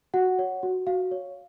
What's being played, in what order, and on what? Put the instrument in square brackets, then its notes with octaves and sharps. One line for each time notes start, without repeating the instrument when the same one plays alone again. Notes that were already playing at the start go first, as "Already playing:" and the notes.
[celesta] F#4 F#5
C#5
F#4
F#4 F5
C#5